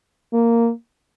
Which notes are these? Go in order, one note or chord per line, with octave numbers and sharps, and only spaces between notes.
A#3